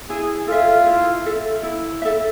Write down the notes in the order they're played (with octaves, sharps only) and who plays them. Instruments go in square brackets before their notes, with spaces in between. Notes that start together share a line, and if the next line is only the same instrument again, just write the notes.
[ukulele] E4 [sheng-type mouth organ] G#4
[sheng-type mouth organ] F4 [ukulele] A4 E5
[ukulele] E4
A4 E5
E4
A4 E5